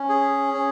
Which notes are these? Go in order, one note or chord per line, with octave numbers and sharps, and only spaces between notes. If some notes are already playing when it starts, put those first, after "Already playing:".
Already playing: C#4
G#4
C#4